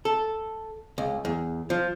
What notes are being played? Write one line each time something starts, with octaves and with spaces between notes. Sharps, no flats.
A4
C#2
E2
F3